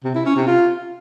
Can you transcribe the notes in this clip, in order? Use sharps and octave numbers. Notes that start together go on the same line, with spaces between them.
C3
E4
C#4
C3
F4